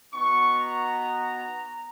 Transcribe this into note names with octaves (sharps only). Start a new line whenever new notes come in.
B3 D#4 F#4 C#6
A#5